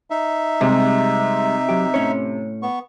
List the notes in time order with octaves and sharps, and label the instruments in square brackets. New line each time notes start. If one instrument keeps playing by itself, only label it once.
[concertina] D#4 E5
[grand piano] C3 [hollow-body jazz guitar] G3 G#3
[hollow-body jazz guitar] F#3 G4
A2 C#4 C#5
[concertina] B3 C#6